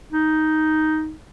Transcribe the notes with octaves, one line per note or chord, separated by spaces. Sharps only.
D#4